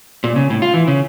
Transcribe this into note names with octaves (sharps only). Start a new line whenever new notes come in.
A#2
C#3
A2
F4
E3
C#3